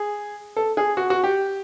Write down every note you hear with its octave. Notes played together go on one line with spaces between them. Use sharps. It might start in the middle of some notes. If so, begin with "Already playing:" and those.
Already playing: G#4
A4
G#4
F#4
F#4
G4